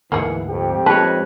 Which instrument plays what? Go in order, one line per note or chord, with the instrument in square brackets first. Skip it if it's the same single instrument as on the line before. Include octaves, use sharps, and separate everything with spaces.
[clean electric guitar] D2 G#2 F#5 [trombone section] E3 [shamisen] A#3 D#4 G#4
[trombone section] F2 G4
[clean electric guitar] G#3 C#4 D#4 [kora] B4 C#5 [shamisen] A5